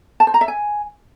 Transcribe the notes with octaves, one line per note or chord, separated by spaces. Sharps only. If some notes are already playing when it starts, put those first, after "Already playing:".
A5
C5
A#5
E5
G#5